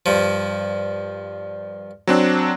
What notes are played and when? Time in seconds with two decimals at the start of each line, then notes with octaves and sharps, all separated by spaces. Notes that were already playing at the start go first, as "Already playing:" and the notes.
0.06 G2 F3
2.07 F#3 C4 D4